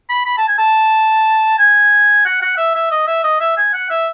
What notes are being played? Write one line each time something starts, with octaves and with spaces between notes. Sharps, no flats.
B5
B5
A5
G#5
A5
G#5
F#5
F#5
E5
E5
D#5
E5
D#5
E5
G#5
F#5
E5